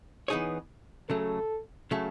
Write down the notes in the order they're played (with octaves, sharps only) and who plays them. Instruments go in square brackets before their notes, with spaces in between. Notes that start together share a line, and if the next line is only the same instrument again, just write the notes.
[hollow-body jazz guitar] E3 B3 D#4 G#4 C#5
[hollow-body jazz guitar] C#3 F#3 A3 [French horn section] A4
[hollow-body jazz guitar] C#3 F#3 A3